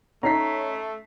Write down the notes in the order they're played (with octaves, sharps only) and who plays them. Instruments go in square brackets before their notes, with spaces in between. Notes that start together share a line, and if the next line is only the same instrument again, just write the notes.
[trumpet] A3 [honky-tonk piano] C#4 D#4 B6 [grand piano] A#5 C7